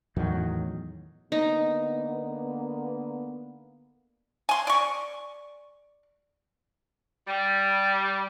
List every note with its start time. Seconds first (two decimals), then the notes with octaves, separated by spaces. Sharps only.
0.16 E2 A2 D#3 F#3
1.32 D3 A#3 B3 D#4
4.49 G#5 C6
4.67 D5 C#6
7.27 G3